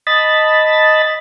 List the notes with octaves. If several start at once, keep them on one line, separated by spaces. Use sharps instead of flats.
D#5 A5 B5 A6